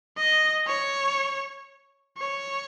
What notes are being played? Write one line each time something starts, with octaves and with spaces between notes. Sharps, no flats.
D#5
C#5
C#5